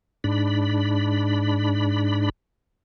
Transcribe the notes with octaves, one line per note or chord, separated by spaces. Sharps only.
G#2 D4 B5